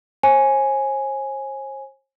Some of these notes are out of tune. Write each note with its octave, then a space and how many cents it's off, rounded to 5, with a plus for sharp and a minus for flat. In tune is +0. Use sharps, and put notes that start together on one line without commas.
C5 +45 G#5 +0